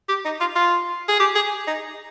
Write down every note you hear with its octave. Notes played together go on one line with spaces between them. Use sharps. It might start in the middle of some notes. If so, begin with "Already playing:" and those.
G4
D#4
F4
F4
G#4
G4
G#4
D#4